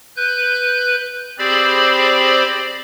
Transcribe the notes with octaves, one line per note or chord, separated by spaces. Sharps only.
B4 F#6 G6
C4 G4 G#4 C5 D5 B5